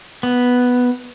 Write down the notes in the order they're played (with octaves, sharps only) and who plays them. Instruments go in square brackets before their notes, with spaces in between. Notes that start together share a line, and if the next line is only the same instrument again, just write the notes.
[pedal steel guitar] B3